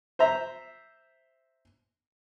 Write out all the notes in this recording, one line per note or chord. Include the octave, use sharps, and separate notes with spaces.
C5 E5 A#5